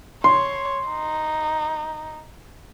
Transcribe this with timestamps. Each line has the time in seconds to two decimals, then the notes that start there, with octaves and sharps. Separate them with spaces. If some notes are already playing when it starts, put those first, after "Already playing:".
0.24 C#5 C6
0.89 D#4